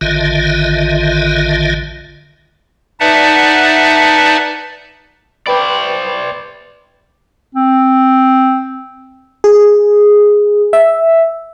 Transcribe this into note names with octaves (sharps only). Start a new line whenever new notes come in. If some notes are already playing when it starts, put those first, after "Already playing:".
A1 D3 D#3 F4 D#5 E5
D#4 B4 D5 E5 F#5 A5
B4 C5 D5 G5 B5
C4
G#4
E5